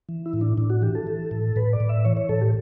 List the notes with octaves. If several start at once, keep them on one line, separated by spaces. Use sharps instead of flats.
E3
E4
A2
D4
A2 D4
F#4
E3 G4
A4
E3
A2
A2 B4
D5
A2
E5
E3 C#5
C#5
A2 A4
G4